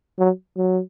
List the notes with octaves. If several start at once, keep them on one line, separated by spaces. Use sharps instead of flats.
F#3
F#3